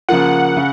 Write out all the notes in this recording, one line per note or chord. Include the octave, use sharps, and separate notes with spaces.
C#3 F3 A#3 F4 F#5
C#3